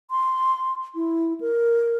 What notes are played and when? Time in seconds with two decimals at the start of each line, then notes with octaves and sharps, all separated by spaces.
0.11 C6
0.95 E4
1.41 A#4